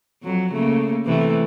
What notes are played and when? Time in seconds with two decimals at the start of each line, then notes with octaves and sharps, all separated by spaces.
0.23 F2 F#3
0.52 C#3 A3 A#3
1.05 C3 E3 A3